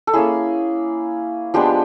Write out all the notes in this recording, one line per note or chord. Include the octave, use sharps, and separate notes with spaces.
A4
A#3 C#4 E4 G#4
F3 G#3 B3 D4 G4